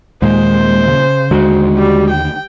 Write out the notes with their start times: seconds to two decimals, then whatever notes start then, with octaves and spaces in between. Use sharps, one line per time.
0.22 D#2 A#2 G#3 A#3 C5
0.87 C#3
1.31 D#2 D3 G#3 F#4
1.77 G3
2.09 G5